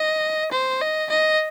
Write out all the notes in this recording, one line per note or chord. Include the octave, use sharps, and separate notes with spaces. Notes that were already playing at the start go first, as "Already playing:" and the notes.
Already playing: D#5
C5
D#5
D#5